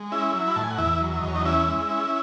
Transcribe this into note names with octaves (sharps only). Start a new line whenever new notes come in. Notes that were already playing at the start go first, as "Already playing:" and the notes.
Already playing: G#3
C#4 E4 E5
F#3
B5
A2 A5
G#5
F#5
E2 E4 E5
F#3
E5
D#5
E2 C#5
D#4 D#5
C#4 E4 E5
G#3
C#4